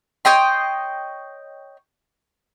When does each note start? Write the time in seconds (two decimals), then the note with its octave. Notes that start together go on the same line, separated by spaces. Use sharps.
0.25 C#5 D#5 G5 C6